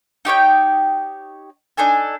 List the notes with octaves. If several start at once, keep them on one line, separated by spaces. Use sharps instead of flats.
D#4 G4 C#5 G5
D4 D#4 A4 G#5